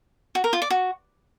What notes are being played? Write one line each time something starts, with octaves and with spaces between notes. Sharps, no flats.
F#4
A#4
F4
D5
F#4